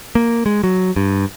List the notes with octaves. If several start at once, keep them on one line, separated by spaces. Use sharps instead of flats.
A#3
G#3
F#3
G2